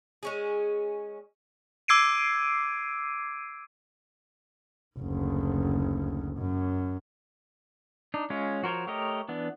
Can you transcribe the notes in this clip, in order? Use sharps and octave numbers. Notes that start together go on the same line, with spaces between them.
G#3 C#4 G#4
D6 E6 G#6 C7 D7 D#7
F#1 D2
F#2
D4 D#4
G#3 C#4 F4
F3 F#4 A#4 C5 C#5
A3 G4 A#4 C#5 D#5
E3 B3 D4